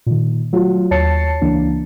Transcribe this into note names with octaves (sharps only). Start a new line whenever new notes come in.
A#2 D#3
F#3 A3 F4 F#4
D#2 C#5 A5 A6 C7 C#7
C#2 E3 A#3 D4